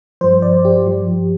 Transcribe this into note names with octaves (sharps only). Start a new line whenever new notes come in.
G2 F3 C5
D5
G4
G2 F3